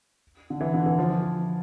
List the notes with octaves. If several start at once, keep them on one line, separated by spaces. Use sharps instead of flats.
D3
E3
D3
E3
F3